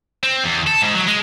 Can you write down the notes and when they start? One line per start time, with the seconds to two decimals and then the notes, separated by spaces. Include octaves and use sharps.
0.23 C4
0.44 E2
0.67 A4
0.82 G#2
0.94 F#3
1.08 G#3